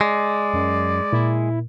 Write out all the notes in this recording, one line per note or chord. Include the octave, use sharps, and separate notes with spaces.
G#3 D5
F#2
A#2 E4